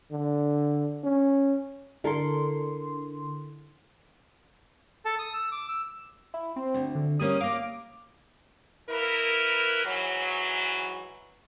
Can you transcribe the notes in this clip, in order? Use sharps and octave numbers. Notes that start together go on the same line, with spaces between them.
D3
C#4
D3 E4 A4 A#4 C6
A4 A5
D#6
E6
D6
E6
E4
C4
D2
D3
G3 A#3 C#4 D#6
A#3 F5 D6
A#3 E4 A#4 B4
G#2 E3 F#3